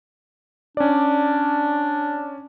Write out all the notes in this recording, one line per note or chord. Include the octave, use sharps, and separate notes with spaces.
C#4 D4 D5